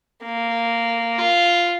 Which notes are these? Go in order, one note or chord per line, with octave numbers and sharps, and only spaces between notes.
A#3
F4